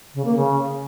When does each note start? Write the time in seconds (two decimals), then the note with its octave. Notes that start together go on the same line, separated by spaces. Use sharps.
0.15 C#3
0.25 A#3
0.35 C#3